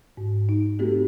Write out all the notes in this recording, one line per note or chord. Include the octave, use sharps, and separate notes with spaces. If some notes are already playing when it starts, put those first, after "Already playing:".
G#2
D#4
A3 B3 C4 F#4 G4 A4